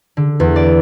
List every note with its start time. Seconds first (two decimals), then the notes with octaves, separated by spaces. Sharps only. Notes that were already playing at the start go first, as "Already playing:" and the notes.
0.17 D3
0.40 E2
0.56 D5